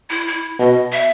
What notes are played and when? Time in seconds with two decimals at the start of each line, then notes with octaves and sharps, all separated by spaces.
0.10 E4
0.27 E4
0.59 B2 D#5
0.92 E5